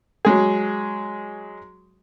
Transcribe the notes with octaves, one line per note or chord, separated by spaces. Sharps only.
F#3 G#3 G#4